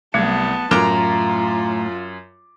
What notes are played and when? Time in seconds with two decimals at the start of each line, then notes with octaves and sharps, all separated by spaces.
0.14 C2 F#3 A3 B3 A5 G#6
0.71 F#2 A2 F4 A4 A#4 A#5 D6 D7